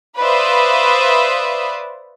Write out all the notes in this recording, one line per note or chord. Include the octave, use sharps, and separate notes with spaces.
B4 C5 D5 E5 F5 D#6